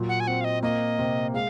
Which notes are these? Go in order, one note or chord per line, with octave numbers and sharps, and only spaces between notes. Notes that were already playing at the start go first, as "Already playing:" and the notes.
Already playing: A#2 F#3
F#5
G#5
C4 F#5
F5
D#5
A#3 D#5
C3
G#3 F5